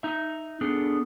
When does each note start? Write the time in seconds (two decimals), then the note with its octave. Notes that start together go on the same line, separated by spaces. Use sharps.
0.03 D#4 E5
0.61 B3 D4 G#4 A4